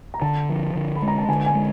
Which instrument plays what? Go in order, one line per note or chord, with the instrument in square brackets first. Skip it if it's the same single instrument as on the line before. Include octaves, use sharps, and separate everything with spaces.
[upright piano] A#5
[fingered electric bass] D3 [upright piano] A5
[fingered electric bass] F3
D3
[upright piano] B5
[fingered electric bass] G#3
[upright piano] A#5
A5
[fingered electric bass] D3 [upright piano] G#5
[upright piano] G#5
[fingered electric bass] G#3